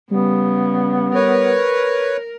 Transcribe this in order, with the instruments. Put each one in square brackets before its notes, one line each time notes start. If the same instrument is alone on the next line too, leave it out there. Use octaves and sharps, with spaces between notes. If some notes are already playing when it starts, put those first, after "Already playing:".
[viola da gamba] C#3 [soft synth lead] G3 [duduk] B3
[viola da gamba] A#4 [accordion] B4 C#5